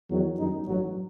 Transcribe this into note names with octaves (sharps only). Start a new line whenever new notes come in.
E2 D#3 F#3
F#2 D#3 G3 D#4
A1 G2 F#3